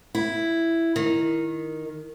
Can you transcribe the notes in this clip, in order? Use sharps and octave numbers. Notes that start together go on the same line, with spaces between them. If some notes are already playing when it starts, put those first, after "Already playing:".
E4
D#3